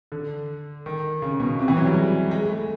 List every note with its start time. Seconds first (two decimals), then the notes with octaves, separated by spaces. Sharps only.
0.12 D3
0.86 D#3
1.22 C#3
1.40 B2
1.59 C3
1.68 E3
1.77 F#3
1.86 G3
1.94 G#3
2.31 G#3
2.49 A3